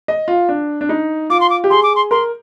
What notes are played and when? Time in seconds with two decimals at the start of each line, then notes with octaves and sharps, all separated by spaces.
0.08 D#5
0.28 F4
0.49 D4
0.81 D4
0.89 D#4
1.30 F4 D6
1.40 C6
1.50 D6
1.64 G4
1.70 G#4 C6
1.83 D6
1.96 C6
2.11 A#4 C6